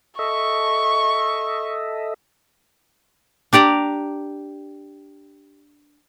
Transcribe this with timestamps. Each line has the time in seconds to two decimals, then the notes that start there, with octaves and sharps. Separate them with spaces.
0.19 A4 D#5 E5 C#6
3.53 D4 G4 D5 A#5